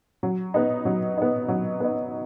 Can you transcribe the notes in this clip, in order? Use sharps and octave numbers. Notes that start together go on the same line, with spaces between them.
F#3
B3 D#4
F#3
B3 D#4
F#3
B3 D#4